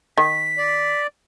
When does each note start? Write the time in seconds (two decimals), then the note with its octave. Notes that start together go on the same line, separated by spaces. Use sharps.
0.18 D#3 B6
0.58 D5